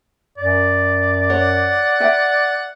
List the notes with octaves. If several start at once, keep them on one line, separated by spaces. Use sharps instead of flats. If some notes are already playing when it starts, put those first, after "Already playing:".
F#2 D5
C#5 F#5
B4 E5 G5